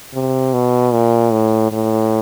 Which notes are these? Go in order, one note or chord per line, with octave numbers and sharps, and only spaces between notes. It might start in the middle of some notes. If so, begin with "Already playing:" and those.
C3
B2
A#2
A2
A2